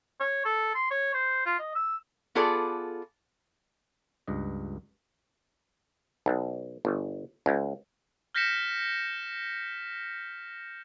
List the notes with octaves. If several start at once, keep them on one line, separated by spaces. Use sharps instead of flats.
C#5
A4
C6
C#5
C5
F4
D#5
E6
B3 F4 G#4 A4 D5
C#2 G2 D#5
B1
G1
C#2
F6 G6 A#6 B6 C#7 E7